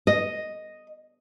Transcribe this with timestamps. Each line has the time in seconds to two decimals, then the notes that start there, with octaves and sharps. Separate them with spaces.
0.07 D#5